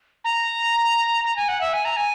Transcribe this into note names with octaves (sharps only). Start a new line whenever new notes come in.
A#5
A#5
G#5
F#5
E5
G#5
A#5
G#5